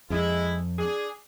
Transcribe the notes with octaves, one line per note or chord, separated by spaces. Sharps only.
F2 G#3 E4
D4 G#4